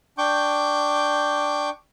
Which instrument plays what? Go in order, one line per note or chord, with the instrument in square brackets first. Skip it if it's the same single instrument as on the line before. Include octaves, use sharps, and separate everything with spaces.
[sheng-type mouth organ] D4 G5 C#6 D6 G6